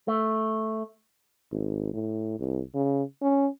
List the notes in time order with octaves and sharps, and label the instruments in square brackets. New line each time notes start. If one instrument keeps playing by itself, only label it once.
[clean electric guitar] A3
[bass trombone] G#1
A2
C2
C#3
C#4